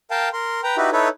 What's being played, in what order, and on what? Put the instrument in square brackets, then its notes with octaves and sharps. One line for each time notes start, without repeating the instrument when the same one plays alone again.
[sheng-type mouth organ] A#4 F5 G5 A5
A#4 C6
B4 G5 A#5
D#4 E4 F#4 G4 B4
D#4 E4 A4 B4 C#5